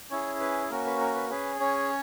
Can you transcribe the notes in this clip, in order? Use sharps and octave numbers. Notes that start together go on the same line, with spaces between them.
C#4 E4 G#4 C#5
B4
A#3 C#4 F#4 A#4
B4
A#4
B4
C#4 G#4 B4
C#4 C#5